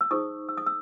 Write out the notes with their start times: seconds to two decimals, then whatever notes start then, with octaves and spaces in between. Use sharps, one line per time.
0.01 E6
0.11 D#4 G#4 C5 C#6 D#6
0.49 E6
0.58 D#6
0.66 E6